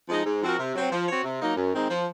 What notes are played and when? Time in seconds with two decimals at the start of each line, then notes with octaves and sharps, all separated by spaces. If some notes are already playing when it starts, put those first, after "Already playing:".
0.09 F3 G#3 D#4
0.26 G#2
0.42 F3 C4 F#4 A#4
0.59 C3
0.75 F#3 C4
0.91 F3
1.08 C4 F#4 C#5
1.24 C3
1.41 F#3 A#3 D#4
1.57 F#2
1.73 D#3 G#3 C4 D#4
1.90 F3